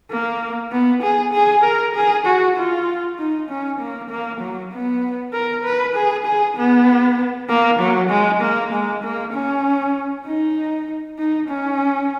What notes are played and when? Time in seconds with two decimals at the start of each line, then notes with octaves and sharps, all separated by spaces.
0.11 A#3
0.72 B3
1.03 G#4
1.34 G#4
1.64 A#4
1.95 G#4
2.27 F#4
2.57 F4
3.19 D#4
3.49 C#4
3.80 A#3
4.10 A#3
4.41 F#3
4.72 B3
5.34 A#4
5.65 B4
5.95 G#4
6.26 G#4
6.57 B3
7.49 A#3
7.80 F#3
8.10 G#3
8.42 A#3
8.73 G#3
9.03 A#3
9.34 C#4
10.26 D#4
11.19 D#4
11.49 C#4